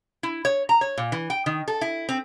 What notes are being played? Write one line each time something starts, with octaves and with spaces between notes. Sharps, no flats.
E4
C#5
A#5
C#5
A#2
E3
G5
D#3
A4
E4
C4